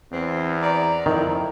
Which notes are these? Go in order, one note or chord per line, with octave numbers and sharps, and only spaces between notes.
E2 C4
D5 A#5
F2 D#3 E4